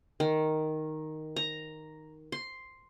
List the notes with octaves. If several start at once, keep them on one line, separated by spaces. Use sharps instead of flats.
D#3
A#5
C6